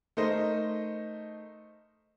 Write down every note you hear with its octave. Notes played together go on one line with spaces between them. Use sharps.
A3 D#4 A#4 C5 D#5